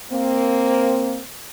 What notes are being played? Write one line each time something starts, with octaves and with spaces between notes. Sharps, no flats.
A#3 C4